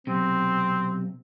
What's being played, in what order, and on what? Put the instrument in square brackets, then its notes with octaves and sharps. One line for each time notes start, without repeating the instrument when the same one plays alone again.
[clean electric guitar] B1 C3 [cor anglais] C4